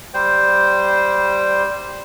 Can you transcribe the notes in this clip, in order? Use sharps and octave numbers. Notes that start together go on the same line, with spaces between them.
G3 C5 G5